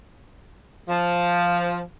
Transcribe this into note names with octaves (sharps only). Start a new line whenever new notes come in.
F3